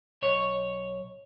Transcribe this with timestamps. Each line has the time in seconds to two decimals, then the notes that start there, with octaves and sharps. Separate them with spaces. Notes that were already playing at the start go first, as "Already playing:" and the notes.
0.22 B1 C#5